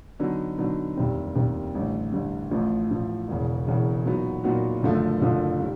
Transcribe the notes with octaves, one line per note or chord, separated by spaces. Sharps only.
D3 F#3 B3 D#4
D3 F#3 B3 D#4
F1 D#2 D#3 G3 C4
F1 D#2 D#3 G3 C4
A1 G2 D3
A1 G2 D3
A1 A2 F3
A1 A2 F3
E1 E2 C#3
E1 E2 C#3
A#2 F#3 B3 D#4 F#4
A#2 F#3 B3 D#4 F#4
F#1 F#2 D3 F3 A3
F#1 F#2 D3 F3 A3
D#3 G3